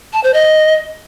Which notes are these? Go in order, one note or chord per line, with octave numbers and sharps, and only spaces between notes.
A5
C5
D#5